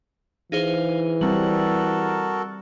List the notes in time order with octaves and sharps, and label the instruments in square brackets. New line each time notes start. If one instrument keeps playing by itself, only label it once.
[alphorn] E3 [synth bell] D#4 G#4 C5 [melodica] F5
[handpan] G3 C4 [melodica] F#4 A4 A#4 [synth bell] F#7